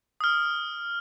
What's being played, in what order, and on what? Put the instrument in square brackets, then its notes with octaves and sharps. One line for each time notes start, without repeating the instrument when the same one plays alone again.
[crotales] D#6 F6